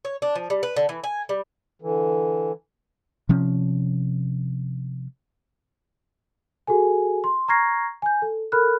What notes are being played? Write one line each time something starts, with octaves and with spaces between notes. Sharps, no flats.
C#5
D4
F3
G3
B4
D3
E3
G#5
G3
D3 E3
C3 F3 C#4
F#4 G#4 A4 G#5
C6
A#5 C#6 F6 G#6 A#6 C7
G#5 G6
A4
A4 A#4 B5 F6 F#6